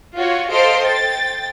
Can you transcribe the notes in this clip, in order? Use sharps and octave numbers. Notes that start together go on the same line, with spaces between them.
F4 F#4 C#5
A4 C5 D#5 F5 C6 D7
G5 A6